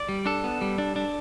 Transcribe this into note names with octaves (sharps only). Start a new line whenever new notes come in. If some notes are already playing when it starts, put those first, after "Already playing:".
Already playing: D5
G3
D4 A4
B3
G3
D4
D4